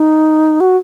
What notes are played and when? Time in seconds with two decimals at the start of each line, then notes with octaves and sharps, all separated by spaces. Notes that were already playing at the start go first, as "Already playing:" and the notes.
Already playing: D#4
0.60 F#4